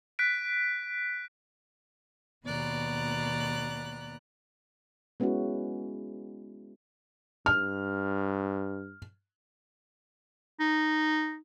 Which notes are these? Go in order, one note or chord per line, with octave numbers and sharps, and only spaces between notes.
F#6 B6 D7
D#2 B2 B3 D5 A#5 F#6
G#3 B3 C#4 E4 F#4
G2 F6
D#4